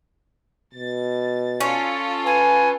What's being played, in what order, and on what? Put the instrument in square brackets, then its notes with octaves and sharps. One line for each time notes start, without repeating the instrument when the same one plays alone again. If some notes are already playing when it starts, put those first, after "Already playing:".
[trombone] B2 [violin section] A6
[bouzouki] C#4 [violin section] F4 A4
[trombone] B4 [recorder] G#5